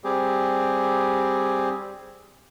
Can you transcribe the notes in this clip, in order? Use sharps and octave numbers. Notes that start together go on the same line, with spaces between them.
G3 C4 G4 G#4